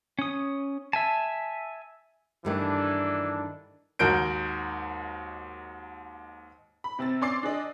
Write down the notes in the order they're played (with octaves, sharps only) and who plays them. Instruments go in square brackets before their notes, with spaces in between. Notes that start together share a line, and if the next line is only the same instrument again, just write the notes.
[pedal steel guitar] C#4 D#6
E5 G#5 A5
[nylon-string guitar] G2 D#3 A3 [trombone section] E3 D4
[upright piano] D#2 G#2 F#4 A#4 G6 D7
[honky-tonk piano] B5
C3 C4 E6 A6
C#4 D5 C6 D6 A6 C7
D4 G#4 D5 D#5